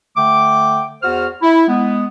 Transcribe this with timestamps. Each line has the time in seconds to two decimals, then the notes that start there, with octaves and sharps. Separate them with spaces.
0.17 D3 A3 G5 D6
1.03 E2 F#4 C5 F6
1.42 E4
1.68 G#3 B3